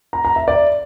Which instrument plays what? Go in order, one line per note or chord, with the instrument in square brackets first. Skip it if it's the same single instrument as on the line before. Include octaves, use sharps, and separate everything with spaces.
[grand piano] A#5
A#5
E5
D5